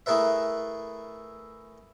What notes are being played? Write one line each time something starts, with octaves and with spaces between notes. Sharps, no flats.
A3 E4 G#4 A#4 B4 E5